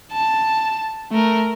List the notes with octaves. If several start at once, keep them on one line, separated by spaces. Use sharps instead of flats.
A5
A3 A#4